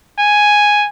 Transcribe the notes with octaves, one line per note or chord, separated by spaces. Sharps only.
G#5